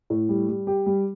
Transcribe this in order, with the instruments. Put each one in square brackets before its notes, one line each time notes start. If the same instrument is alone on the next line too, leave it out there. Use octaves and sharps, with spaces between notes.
[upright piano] A2
G3
G3
G4
G3